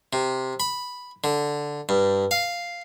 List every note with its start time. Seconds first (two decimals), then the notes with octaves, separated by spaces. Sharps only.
0.13 C3
0.60 B5
1.24 D3
1.89 G2
2.31 F5